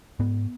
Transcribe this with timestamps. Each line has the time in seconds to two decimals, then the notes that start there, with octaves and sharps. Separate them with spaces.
0.19 G#2 B3